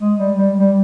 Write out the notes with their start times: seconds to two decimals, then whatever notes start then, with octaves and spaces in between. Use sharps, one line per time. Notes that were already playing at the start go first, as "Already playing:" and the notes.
0.01 G#3
0.19 G3
0.39 G3
0.58 G3